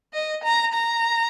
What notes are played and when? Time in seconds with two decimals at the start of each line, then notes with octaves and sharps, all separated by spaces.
0.14 D#5
0.44 A#5
0.74 A#5